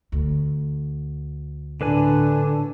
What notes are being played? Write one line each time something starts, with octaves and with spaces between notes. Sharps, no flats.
D2
A2 D3 D4 B4 G#5